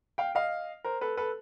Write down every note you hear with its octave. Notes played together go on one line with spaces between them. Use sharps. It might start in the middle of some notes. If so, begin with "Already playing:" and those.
F5 G5
D#5 F5
A#4 C5
A4 B4
A4 B4